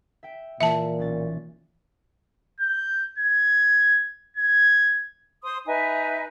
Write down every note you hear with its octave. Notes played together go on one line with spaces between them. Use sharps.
E5 G5
A#2 E3 E5 A5
B1 C#4 A6
G6
G#6
G#6
C5 C6 D#6
D#4 B4 E5 G#5